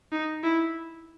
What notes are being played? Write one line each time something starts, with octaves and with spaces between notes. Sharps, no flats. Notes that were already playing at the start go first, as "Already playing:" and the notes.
D#4
E4